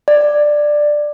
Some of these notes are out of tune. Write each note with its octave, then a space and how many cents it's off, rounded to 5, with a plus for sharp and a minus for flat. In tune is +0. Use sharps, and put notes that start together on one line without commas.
D5 +10